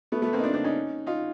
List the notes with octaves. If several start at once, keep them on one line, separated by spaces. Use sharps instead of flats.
A3 B3
A3 B3
A#3 C4
D#4
C4 D4
C4 D4
C#4 D#4
D#4 F4